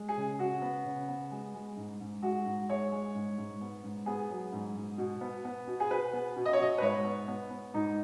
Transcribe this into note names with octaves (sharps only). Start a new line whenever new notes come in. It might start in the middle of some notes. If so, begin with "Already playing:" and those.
Already playing: G#3
G#4
C#3
C#3 F#4
B3
C#3
B3
G#3
G#3
G#2
G#2
G#3 F#4
G#2
G#3 C#5
G#3
G#2
G#2
B3
G#2
B3 G#4
F#3
G#2
G#2
B2
B3
B3
B2
G#4
B2 B4
B3
B2
D#5
C#5
B2 D#5
B4
G#2 C#5
B3
B3
B3
G#2 D#4